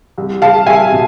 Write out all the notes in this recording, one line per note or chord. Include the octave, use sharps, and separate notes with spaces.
C2
C2 F5 A5
C2 E5 G#5
B2